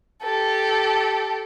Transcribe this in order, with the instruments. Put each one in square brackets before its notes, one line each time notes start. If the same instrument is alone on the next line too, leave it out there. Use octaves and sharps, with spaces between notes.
[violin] G4 A4